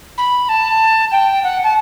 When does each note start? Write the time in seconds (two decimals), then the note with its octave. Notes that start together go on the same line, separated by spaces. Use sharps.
0.18 B5
0.49 A5
1.12 G5
1.44 F#5
1.63 A5